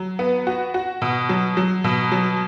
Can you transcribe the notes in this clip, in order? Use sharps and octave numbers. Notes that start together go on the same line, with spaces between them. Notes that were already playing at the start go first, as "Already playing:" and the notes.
Already playing: F#3
B3
F#4
F#4
B2
F#3
F#3
B2
F#3